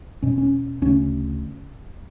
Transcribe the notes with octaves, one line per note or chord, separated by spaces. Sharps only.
E2 B2 C#4
C#4
D2 C#3 C#4